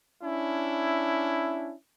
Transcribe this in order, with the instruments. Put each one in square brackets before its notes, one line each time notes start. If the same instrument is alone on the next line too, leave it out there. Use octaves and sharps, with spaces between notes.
[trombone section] C#4 D4 E4